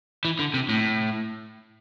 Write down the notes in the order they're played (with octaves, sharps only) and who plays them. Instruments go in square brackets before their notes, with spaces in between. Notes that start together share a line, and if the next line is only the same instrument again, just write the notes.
[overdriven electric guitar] E3
D3
C3
A2